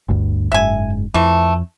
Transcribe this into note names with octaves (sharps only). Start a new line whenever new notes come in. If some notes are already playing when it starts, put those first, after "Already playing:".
G1 D2 G2
F#1 G#2 E5 G#5
F2 E3 A3